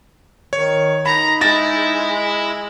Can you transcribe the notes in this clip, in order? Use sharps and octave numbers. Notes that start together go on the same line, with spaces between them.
D#3 C#5
D#4 A#5 B5
G#3 E4 A6 A#6